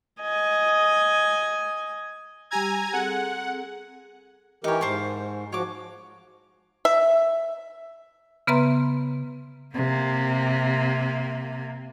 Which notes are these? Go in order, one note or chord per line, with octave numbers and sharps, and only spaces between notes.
D#5 G#5
G3 G4 G#5 A#5 E6 G#6
C4 G#4 A4 F#5
E3 D#4 G4 A#4 C#5
G#2 C5 A5 C#6
F3 F#4 C#5 D6
E5
C#3 B3 B4 E5 A#5 C6
C3 A#3